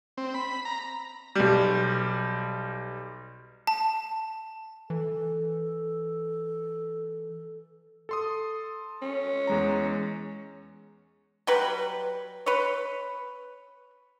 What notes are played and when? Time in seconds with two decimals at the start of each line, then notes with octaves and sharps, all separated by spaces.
0.18 C4
0.34 B5
0.65 A#5
1.35 B1 G3
3.67 A5
4.90 E3 A4
8.09 A4 C6 D#6
9.02 C#4
9.47 E2 G#3 A#5
11.47 F#3 G3 B4
12.46 B4 C#5